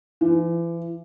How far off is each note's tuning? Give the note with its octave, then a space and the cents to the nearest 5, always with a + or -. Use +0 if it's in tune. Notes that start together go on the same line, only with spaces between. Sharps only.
E3 +35